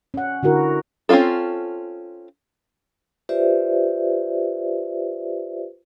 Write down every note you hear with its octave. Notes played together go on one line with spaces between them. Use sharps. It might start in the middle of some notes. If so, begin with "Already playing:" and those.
C#4 F#5
D3 E4 F#4 A#4
C4 C#4 E4 F4 A4
F4 G4 B4 C5 D5 E5